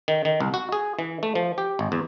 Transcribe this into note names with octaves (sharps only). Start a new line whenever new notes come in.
D#3
D#3
C2
F#4
G#4
E3
A3
F3
G4
G#1
E2